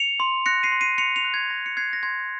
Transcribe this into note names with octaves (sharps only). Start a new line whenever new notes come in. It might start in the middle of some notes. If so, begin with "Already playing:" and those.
Already playing: C#7 F7
C6
F#6 A#6 C#7
C7 D#7
C6
C7 D#7
C6 C#7 F7
C#7 F7
F#6
G#6
C6 A#6
C#7
F#6 G#6 C7
A#6
C6 G#6